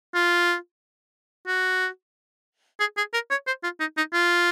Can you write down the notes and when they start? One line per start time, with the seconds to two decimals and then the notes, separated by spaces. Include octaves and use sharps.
0.15 F4
1.47 F#4
2.80 G#4
2.97 G#4
3.14 A#4
3.31 C#5
3.47 C5
3.64 F4
3.80 D#4
3.98 D#4
4.13 F4